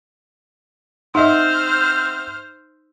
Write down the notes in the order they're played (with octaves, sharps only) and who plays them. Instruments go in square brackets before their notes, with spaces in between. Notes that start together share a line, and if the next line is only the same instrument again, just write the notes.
[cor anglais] C4 [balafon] D#4 [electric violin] C5 F6 [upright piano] D#5 E5 F#5